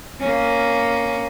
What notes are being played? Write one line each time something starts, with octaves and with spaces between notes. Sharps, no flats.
A#3 C#4